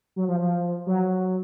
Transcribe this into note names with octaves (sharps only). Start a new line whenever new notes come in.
F#3
F3
F3
F#3